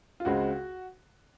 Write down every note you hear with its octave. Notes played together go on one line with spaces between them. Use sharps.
F4
C#2 C#3 G#3 C4 F#4